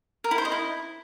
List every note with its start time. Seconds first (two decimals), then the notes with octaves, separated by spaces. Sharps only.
0.24 A#4
0.31 E4
0.38 C5
0.45 D#5
0.52 E4